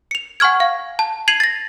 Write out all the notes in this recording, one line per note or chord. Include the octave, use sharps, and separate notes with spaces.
C#7 F7
F#5 G#5 C#6 F6 G#6
F5
A5
G#6 C7 D#7 F7 F#7
A6 A#6